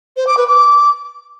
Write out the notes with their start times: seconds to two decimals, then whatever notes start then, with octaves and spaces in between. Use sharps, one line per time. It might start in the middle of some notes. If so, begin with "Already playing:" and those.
0.16 C5
0.27 D6
0.37 B4
0.47 D6